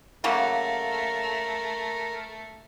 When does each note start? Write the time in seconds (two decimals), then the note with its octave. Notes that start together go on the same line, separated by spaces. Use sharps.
0.24 C#3 F#3 A3 A#3 A#4